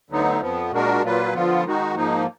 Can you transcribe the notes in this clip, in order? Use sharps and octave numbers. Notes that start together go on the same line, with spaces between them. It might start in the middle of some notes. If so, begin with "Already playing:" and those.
D2 D3 F#3 B3 D#4
F2 F3 B3
A#2 G#3 D4 F#4 A#4
A#2 F#3 A#3 F4 B4
D3 F3 B3 F4
D#3 G#3 D#4 F#4
G#2 F3 A#3 D#4